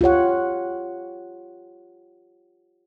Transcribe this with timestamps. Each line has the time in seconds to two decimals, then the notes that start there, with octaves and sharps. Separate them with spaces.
0.01 F4 G4 C#5 F#5